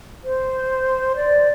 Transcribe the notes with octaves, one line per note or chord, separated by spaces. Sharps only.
C5
D5